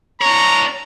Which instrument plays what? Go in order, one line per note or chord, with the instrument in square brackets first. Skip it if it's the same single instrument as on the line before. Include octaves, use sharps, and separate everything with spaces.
[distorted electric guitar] D4 C#5 [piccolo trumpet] A#5